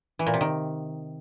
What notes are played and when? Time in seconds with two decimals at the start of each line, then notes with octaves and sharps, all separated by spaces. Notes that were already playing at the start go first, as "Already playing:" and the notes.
0.19 E3
0.26 A#2
0.34 C3
0.41 D#3